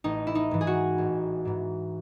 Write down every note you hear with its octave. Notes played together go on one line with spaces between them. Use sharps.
A1 D#4
E4
D#4
G#2 E3
G#4
F#4
A1
G#2 E3